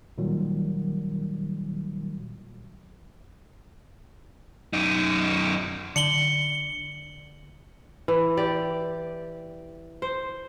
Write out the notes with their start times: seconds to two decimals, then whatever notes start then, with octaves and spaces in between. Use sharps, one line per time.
0.18 A#2 D#3 F#3 G3
4.73 F#2 D#4
5.96 D3 C#7 F#7 G7
8.08 E3
8.37 G4 D5
10.02 C5